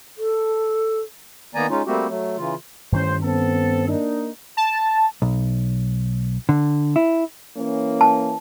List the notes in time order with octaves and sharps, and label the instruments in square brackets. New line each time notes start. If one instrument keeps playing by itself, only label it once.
[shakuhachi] A4
[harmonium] D#3 A#3 B3 D5 G#5 A#5
G#3 C#4 D#4 F4
G3 A3 A#3 C4 F#4 G4
F#3 A3
C#3 E3 F4
[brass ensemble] A1 C5 [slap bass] G2 D#3 C#4
[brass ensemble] B3 C4 A4
A#3 D4 D#4
[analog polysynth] A5
[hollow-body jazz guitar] B1
D3
E4
[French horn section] E3 A#3 C#4
[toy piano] A5